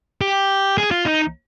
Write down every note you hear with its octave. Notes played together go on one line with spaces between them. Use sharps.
G4
G#4
F4
D#4